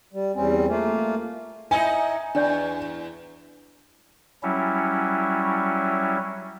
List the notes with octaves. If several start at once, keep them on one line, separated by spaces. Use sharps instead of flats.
G3
E2 G3 C4 C#4
A3 A#3 F4
D#4 E4 D#5 G#5
E2 D4 D5 G6
F#3 G3 C#4 E4